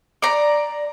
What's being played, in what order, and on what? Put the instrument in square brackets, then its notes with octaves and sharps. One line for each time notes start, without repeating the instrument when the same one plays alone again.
[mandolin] D5 A#5